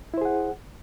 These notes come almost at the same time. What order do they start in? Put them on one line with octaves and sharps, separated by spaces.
E4 C5 G#4 F#5